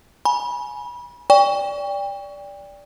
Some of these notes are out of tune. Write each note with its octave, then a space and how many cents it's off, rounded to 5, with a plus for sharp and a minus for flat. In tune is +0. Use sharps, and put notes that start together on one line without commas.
G#5 +15 B5 -30
D5 -15 G5 +30 C#6 +20